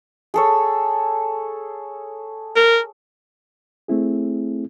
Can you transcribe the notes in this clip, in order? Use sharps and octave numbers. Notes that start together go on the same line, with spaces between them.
G#4 A4 C#5
A#4
A3 C4 E4 G#4